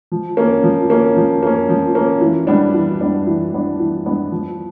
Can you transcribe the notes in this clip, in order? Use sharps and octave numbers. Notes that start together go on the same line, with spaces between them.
F3
A#3 C#4
F3
A#3 C#4
F3
A#3 C#4
F3
A#3 C#4
E3
G3 B3 D4
E3
G3 B3 D4
E3
G3 B3 D4
E3
G3 B3 D4
F3